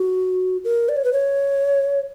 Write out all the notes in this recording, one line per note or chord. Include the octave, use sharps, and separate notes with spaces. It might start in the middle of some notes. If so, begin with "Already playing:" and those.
Already playing: F#4
A#4
D5
C#5
B4
C#5